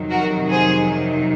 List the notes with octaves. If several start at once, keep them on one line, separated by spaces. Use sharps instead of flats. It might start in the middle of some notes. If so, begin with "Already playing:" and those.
Already playing: F2 C3 D#3 F#3
F#4 A#4
G#4 C5